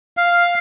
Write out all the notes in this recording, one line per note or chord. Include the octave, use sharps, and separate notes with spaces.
F5